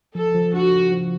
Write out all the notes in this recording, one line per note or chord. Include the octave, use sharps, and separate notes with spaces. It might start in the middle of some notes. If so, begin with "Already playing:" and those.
F3 A4
F3
D4 F#4
F3
F3